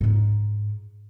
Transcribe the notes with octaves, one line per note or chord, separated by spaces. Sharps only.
G#2 D#4